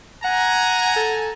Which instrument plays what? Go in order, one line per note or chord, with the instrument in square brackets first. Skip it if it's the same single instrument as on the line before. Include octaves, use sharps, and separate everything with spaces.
[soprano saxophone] F#5 [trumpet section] G#5 A#5
[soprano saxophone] A4